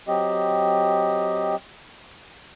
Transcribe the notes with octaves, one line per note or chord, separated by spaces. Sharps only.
F#3 C4 G4 D#5